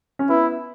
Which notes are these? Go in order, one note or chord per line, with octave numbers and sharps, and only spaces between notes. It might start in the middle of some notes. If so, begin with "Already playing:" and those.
C#4
B3 E4